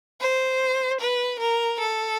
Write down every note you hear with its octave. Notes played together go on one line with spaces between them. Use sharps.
C5
B4
A#4
A4